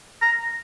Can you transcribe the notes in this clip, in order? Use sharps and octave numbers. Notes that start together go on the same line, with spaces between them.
A#5